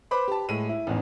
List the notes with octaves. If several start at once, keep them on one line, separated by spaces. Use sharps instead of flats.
B4 C5 B5 D6
G4 A5
A2 G#3 D#7
E4
A1 E2 G#2